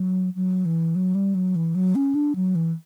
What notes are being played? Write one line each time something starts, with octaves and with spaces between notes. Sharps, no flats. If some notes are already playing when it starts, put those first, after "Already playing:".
Already playing: F#3
F#3
E3
F#3
G3
F#3
E3
F#3
C#4
D4
F#3
E3